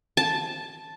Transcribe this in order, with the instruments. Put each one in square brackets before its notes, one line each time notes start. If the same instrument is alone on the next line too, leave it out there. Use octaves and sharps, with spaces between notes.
[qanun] A5